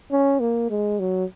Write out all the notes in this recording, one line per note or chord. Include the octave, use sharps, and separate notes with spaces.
C#4
A#3
G#3
F#3